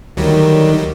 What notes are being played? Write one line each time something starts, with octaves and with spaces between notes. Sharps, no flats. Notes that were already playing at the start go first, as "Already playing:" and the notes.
D2 D#3 F#3 G3